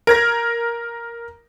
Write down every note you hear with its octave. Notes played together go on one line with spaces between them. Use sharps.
A#4 G#6 A#6